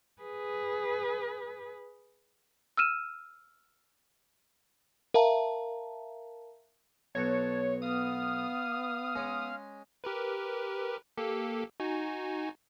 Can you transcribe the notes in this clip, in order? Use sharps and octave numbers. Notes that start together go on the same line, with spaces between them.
G#4 B4
E6 F6 D#7 E7
A#4 E5 F5 A5 A#5
B1 F#4 C#5 A5
B3 F5 D#6 F6
G#3 C#4
G4 A#4 B4
A#3 G4 A4
D#4 F#4 G#5